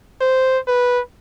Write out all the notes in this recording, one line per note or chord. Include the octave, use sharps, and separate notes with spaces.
C5
B4